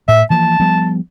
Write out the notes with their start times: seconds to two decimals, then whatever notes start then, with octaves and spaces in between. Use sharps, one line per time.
0.08 A2 E5
0.30 E3 F3 A#3 A5
0.60 F3 G3 B3